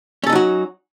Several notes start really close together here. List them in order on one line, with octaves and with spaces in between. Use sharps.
C#4 A4 D#4 F#3 F#4